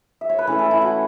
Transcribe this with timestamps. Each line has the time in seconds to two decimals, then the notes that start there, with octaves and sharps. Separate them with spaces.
0.21 E5
0.29 C#5
0.39 B4
0.47 E3 A3 C#4 A4
0.59 A4
0.71 E4
0.82 F#4